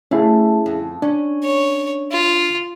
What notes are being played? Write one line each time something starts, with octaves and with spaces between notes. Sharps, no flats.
A3 C#4 E4 G#4 F5
F2
C#4 D4
C#5
F4